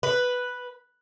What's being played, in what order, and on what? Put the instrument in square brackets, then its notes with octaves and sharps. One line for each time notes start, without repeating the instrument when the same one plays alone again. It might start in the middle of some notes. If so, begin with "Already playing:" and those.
[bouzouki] B4